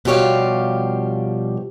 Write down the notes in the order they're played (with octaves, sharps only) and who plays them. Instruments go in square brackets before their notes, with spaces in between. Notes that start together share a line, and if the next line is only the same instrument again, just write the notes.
[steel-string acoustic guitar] B2 F3 G3 G4 C#5 F5